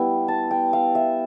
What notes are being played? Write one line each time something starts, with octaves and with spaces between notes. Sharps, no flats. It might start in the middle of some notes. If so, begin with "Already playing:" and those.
Already playing: G3 B3 E4
A5
G5
F5
E5